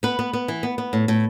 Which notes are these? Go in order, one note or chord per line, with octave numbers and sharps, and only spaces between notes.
B3 B4
B3
B3
E3
B3
B3
A2
A2